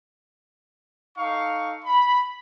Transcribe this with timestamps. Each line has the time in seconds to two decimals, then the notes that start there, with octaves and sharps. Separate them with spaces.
1.18 D#4 A4 F5 C#6
1.85 B5